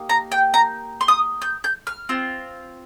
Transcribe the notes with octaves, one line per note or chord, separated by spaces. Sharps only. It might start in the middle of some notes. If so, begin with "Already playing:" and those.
Already playing: A#3 D#4 G4
A#5
G5
A#5
C6
D#6
G6
G6
F6
C4 F4